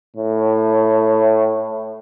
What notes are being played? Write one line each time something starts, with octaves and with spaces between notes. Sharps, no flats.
A2